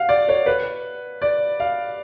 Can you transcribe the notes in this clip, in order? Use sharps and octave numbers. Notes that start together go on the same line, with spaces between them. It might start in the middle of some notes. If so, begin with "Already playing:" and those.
Already playing: F5 F#5
D5
C#5
B4
D5
F5